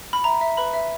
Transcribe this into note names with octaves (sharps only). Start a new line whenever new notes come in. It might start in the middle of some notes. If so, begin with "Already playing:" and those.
B5
E5 A#5
E5
B4 B5
E5